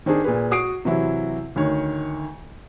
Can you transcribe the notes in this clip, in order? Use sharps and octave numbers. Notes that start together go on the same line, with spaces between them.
D#3 C4 D4 G#4
A#2 G#4 B4
F#4 D#6 C7 D7
C3 E3 F#3 E4
D2 D#3 C#5